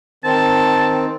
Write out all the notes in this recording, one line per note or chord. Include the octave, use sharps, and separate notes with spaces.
D#3 C4 A5